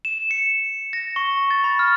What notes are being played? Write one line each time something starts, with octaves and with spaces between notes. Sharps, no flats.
E7
C#7
A#6
C#6
A6
B5
F6